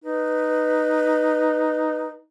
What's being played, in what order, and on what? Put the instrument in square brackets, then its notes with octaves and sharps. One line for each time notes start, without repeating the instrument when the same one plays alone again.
[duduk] D#4 [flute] B4